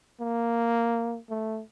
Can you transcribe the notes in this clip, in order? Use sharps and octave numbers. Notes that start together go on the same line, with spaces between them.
A#3
A3